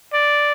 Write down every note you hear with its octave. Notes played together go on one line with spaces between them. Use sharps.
D5